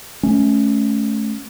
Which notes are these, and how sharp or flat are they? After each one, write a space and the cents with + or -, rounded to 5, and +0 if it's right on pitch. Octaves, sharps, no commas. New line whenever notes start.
A3 -25 C#4 +0